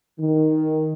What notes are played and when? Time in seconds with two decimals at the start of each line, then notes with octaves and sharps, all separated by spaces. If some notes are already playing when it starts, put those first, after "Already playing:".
0.20 D#3